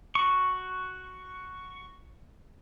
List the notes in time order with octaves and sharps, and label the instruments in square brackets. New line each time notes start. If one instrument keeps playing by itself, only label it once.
[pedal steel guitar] F#4 C#6